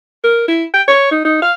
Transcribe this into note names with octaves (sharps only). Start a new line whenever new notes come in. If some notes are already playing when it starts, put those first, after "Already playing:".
A#4
E4
G5
C#5
D#4
D#4
F5